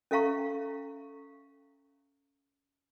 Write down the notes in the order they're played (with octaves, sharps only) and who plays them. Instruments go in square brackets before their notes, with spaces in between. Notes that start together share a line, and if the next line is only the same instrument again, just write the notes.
[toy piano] C#4 A4 E5 F5 A#5 C#6